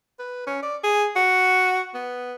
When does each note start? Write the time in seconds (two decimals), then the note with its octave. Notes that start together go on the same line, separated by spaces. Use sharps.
0.19 B4
0.47 C#4
0.63 D5
0.84 G#4
1.16 F#4
1.94 B3